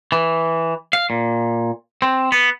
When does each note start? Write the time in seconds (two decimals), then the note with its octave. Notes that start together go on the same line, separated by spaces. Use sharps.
0.12 E3
0.93 F5
1.10 A#2
2.02 C4
2.32 B3